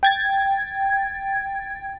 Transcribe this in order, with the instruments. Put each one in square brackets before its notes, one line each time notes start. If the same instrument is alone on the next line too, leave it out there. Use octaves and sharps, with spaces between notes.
[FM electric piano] G5 G#6 A6